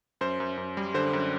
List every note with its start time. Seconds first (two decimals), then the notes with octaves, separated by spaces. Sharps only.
0.21 F#2 C5
0.40 F#2
0.57 F#2
0.77 G3
0.94 D3 C5
1.13 F#2